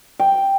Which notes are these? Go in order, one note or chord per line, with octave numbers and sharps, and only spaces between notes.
G5